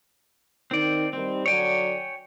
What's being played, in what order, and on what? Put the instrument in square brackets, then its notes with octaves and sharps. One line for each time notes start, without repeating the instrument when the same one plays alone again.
[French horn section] D#3 D#4 [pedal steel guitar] C4 D5
[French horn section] D#3 G3 [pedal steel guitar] C4
[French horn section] D3 F#3 D5 [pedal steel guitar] C#5 G5 G#5